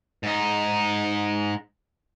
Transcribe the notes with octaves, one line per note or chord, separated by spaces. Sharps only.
G#2 D#4